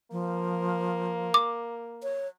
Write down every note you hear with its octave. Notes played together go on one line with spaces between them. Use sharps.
F3 A#3
D6
C#5